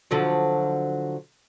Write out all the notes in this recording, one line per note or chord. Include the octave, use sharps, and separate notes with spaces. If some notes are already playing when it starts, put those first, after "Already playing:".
D3 F3 F#3